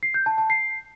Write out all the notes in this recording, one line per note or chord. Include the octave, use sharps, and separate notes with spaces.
C7
G6
A5
A5
C7